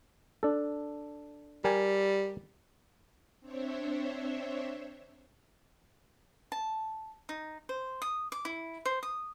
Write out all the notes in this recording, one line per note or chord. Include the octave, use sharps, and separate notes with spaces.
D4 A4
G3 A#4 G5 G#5
C4 D4 C5 C#5 E5
A5
D#4
C5
D#6
D6
E4
C5
D#6